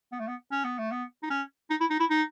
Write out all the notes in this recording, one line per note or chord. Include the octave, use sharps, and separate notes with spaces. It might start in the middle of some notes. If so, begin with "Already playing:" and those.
B3
A3
B3
C#4
B3
A3
B3
D#4
C#4
D#4
E4
D#4
E4
D#4